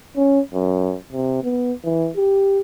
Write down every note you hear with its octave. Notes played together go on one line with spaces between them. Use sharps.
C#4
F#2
C3
B3
E3
G4